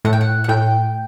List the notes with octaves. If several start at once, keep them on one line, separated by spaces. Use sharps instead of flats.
A2 F#5
G5
F#5
F#5
A2 G5